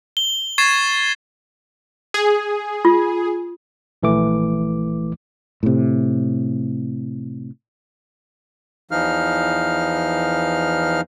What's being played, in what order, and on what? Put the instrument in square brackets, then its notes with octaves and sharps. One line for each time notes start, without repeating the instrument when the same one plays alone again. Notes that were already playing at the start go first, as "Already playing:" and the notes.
[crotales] G7
C#6 G#6 A6 C7 E7
[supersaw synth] G#4
[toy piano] F4
[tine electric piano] A#1 E3 A3 D6
[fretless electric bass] A2 C3
[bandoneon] E2 E3 F3 D#4 F5 F6